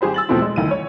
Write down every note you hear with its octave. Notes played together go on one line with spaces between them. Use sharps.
G#1 G4 G#4 C5 B5
E6 A6 F#7
E2 B2 F3 A3 C4 E4
G#3
D2 D#3 E3 D#7
C#5